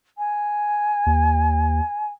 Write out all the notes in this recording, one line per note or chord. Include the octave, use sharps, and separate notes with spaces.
G#5
D#2